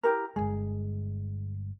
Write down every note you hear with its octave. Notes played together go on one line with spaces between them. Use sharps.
E4 G4 A#4
G1 C2 G#3 G#4